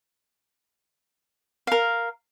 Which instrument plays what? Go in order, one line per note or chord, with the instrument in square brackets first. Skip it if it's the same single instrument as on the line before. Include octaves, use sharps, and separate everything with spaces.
[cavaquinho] A#4 F5